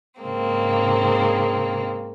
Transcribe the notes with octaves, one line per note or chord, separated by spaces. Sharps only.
G#2 C#3 G#3 A#3 C4